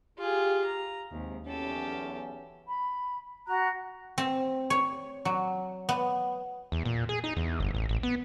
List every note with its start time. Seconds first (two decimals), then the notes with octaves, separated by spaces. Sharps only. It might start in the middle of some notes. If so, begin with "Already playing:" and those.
0.19 F4 G4 G#4
0.64 A#5
1.12 D#2 G#2 C3
1.46 B1 E2 C#4 G4 A4
2.66 B5
3.46 F#4 A#5 F#6
4.18 C4
4.70 C#5
5.25 F#3
5.89 B3
6.72 E2
6.85 A#2
7.09 G#4
7.24 D#4
7.37 E2
7.60 G1
7.74 A1
7.89 A1
8.03 B3